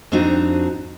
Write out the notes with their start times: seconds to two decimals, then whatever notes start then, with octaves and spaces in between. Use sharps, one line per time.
0.12 F2 C4 D4 D#4 F#4 A#5